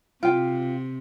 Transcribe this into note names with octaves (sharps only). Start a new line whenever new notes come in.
C3 F4 G5